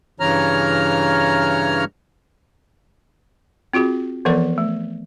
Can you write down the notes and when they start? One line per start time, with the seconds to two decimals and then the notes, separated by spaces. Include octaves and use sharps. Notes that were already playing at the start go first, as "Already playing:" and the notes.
0.20 G2 C#3 E3 C#5 A#5 F6
3.73 C4 F4 F#4 G#4
4.25 E3 F3 B3 A4 A#4 D5
4.58 A3